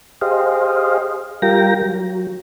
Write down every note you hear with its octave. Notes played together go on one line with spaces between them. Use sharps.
G4 G#4 C5 D#5 F5
G3 F4 A#4 G5 A#6
F#3